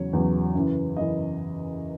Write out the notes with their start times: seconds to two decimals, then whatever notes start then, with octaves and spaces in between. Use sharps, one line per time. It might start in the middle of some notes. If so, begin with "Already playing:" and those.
Already playing: E2 C#3 F#3 C#5
0.13 E2 C#3 F#3
0.55 F#2 C#3 E3
0.96 F#2 C#3 E3 D#5